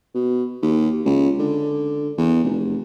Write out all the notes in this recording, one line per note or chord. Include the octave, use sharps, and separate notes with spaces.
B2
D#2
C#2
D3
E2
F1